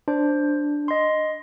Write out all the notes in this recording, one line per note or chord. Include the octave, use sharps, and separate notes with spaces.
D4 C5
D#5 C6